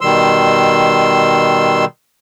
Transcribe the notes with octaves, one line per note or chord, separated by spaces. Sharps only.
B2 D#3 G3 C6 E6